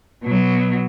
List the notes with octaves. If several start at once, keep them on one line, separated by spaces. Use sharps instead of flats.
B2 F#3